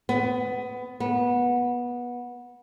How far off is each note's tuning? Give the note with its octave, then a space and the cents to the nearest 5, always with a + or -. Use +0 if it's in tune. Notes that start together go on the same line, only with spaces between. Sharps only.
B3 +20
B3 -20